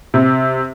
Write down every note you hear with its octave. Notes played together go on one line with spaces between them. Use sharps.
C3